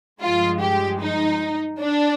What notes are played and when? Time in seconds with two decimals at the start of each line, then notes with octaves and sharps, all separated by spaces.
0.22 G2 F3 G#3 F4
0.61 G4
1.01 D#4
1.81 D4